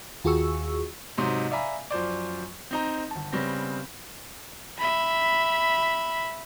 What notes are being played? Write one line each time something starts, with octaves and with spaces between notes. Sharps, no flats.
D#2 F4 F#4 G#4 C#6 E6
G#2 C3 F#3 D#4 C6
D5 E5 F5 G#5 A#5 B5
F#2 F3 C5 D5
C4 D#4 A#5
G1 A5
C#3 G3 B3 C4 A#6
E5 B5